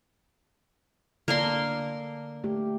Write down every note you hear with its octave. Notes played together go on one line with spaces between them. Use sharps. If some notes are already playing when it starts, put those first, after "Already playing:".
D3 A#3 A4 A#4 D5 C6
A3 G4